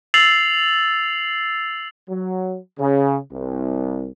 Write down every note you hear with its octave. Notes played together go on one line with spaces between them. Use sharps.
E6 A6 C7 F7 F#7
F#3
C#3
C2